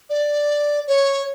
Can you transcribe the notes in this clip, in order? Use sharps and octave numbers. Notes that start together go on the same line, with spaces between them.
D5
C#5